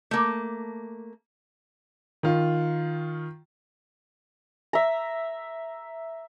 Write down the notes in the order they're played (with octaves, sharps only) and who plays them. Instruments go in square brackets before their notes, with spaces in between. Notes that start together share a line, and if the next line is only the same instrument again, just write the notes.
[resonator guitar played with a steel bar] A3 A#3
[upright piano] D#3 F4
[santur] E5 A#5